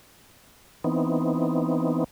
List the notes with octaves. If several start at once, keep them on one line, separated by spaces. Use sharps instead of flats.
E3 B3 C4 D#4